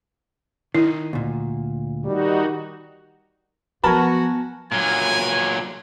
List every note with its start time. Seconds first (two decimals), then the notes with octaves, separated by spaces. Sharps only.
0.75 D#3 D#4 E4
1.13 D2 A#2
2.05 D#3 G3 D#4 F#4
3.84 F3 F#3 B3 F#4 A#4 G#5 A5 B5
4.72 A#2 F#3 G#5